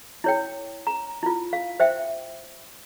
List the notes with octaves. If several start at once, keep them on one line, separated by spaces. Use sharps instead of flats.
E4 C#5 G5
A#5
E4 F4
F5
C5 E5 G5